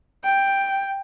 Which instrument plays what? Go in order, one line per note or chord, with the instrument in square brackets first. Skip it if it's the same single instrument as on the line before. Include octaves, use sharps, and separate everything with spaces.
[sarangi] G5